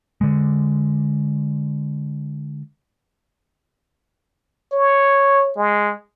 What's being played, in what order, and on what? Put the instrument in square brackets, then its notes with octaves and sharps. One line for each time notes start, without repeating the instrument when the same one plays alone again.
[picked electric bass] D3 G#3
[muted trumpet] C#5
G#3